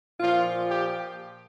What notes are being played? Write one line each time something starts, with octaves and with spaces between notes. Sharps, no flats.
A#2 F3 F4
G4